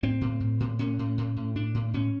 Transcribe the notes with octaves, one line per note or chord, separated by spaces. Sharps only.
A2 C4
A2
A2
A2
A2 C#4
A2
A2
A2
A2 D4
A2
A2 C#4